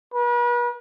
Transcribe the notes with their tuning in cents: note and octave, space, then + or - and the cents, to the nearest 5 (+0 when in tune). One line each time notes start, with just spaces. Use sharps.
B4 -40